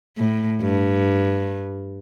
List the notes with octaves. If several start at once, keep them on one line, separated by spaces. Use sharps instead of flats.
A2
G2